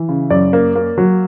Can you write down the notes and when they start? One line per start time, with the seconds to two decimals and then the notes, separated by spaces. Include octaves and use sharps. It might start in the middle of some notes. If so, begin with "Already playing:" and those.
Already playing: E3
0.09 C#3
0.30 F#2 D5
0.53 A#3
0.76 A#3
0.98 F#3